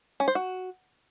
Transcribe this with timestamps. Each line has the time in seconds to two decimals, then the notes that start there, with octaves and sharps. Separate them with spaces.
0.20 C#4
0.28 C5
0.35 F#4